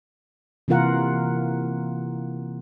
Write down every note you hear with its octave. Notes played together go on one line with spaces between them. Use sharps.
C3 E3 A#3 F4 A#4 F#5